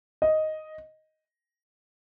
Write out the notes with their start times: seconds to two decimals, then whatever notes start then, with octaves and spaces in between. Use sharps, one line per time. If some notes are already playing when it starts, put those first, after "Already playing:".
0.22 D#5